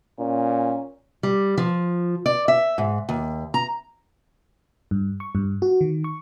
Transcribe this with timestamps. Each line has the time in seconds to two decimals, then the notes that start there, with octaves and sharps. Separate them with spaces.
0.19 A#2 C#4
1.23 G3
1.58 F3
2.26 D5
2.48 E5
2.78 G#2
3.09 D#2
3.54 A#5
4.91 G2
5.20 C#6
5.35 G2
5.62 F#4
5.81 D#3
6.04 C#6